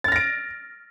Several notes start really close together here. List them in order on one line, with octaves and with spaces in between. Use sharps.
A6 F6 A#6 D7